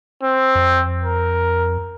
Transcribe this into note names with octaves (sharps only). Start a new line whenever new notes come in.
C4
F2
A#4